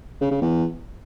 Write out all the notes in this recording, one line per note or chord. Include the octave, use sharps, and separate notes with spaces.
C#3
C#3
E2